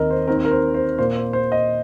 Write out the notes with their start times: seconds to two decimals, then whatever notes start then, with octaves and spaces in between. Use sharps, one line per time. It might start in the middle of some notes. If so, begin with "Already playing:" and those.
Already playing: D#2 D#3 C4 A#4 D#5
0.11 C5
0.28 D#2 D#3 C4 A#4
0.45 A#4
0.51 C5
0.74 C5
0.98 A#2 A#3 C5
1.16 C5
1.33 C5
1.52 D#5